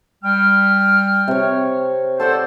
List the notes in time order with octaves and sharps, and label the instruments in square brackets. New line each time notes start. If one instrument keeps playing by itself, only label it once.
[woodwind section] G3 G5 F6
[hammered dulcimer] C3 C#5
[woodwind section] A4 C5 [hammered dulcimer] D5 F#5 A5